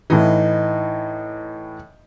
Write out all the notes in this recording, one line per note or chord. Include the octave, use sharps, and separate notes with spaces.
A2 E3 D#4